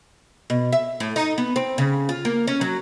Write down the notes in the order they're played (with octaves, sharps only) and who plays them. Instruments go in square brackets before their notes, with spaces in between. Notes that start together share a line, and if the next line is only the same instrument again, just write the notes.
[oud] B2
E5
A2
D#4
B3
C4
C#3
F4
A#3
C#4
F#3